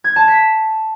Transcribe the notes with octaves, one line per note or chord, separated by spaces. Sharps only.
G#6
A5
B6